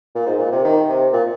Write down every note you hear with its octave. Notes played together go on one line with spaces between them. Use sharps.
A#2
G#2
A#2
C3
D#3
C3
A#2